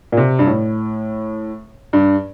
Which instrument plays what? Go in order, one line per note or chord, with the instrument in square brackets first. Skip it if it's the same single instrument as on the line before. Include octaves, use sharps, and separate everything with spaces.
[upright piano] A#2
C3
G2
A2
G2